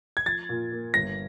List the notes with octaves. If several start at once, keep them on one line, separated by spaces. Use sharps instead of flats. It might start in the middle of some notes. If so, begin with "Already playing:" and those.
G#6
F3 A6
A#2
A#3
G1 A#6